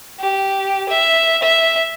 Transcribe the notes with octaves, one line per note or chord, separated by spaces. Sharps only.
G4
E5
E5